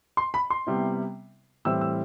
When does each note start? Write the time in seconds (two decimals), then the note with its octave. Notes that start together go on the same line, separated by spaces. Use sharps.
0.17 C6
0.34 B5
0.50 C6
0.67 C3 G3 B3 E4
1.65 A2 E3 G3 C4 E4 E6
1.81 E6